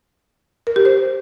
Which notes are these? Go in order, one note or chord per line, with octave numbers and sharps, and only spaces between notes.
A#4
G4
C5